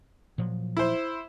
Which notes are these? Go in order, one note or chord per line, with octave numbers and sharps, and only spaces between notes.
A#2 F3 F#3
E4 C5